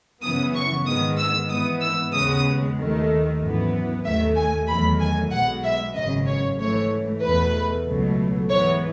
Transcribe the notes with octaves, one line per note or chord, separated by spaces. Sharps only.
F#2 C#3 E3 B3 D#6
C#6
G#2 D#3 G#3 B3 D#6
E6
G#2 E3 B3 D#6
E6
D#2 C#3 G#3 B3 D#6
D#2 D#3 A3
G#1 F#2 E3 B3
D#2 D#3 A3 E5
G#5
E2 D#3 F#3 A3 B5
G#5
B1 B2 G#3 F#5
E5
G#1 F#2 C#3 D#5
C#5
G#2 E3 A3 C#5
E2 B2 A3 B4
C#2 B2 F#3 A3
G#2 E3 G#3 B3 C#5